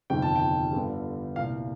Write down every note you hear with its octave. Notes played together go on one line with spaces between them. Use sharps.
G1 F2 C3 D#3 G5
A5
G5
G1 G2 D3
C2 A#2 F5